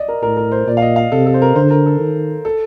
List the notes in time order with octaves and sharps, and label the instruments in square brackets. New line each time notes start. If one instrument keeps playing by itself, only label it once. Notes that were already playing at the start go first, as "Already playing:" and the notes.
Already playing: [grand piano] D5 D#5
A#4
[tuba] A2 [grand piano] A#4
[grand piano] A#4
C5
[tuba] A#2 [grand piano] D5
[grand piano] F5
D#5
F5
[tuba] C3 [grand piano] A4
[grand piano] A4
C5
A#4
[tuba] D3 [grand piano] C5
[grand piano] A#4
A4
[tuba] D#3
[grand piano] A4